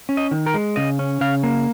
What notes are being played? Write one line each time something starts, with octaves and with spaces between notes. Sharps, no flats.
C#4
D#5
D#3
A#4
G#3
C#3 D#5
C#4
C#3 F5
A#3